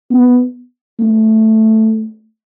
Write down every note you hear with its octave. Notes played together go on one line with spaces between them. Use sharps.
B3
A3